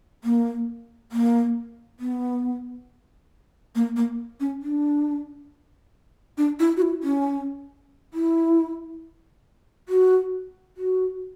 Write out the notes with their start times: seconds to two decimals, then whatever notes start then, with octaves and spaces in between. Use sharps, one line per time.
0.24 A#3
1.12 A#3
2.00 B3
3.75 A#3
3.96 A#3
4.40 C#4
4.62 D4
6.38 D4
6.60 E4
6.77 F#4
6.82 E4
7.03 C#4
8.14 E4
9.89 F#4
10.77 F#4